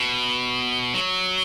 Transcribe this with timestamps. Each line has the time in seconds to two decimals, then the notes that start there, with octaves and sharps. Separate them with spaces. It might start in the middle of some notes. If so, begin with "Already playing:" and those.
Already playing: B2
0.94 F#3